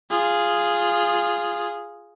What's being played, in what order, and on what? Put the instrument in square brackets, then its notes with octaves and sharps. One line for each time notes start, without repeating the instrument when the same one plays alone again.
[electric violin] F4 G#4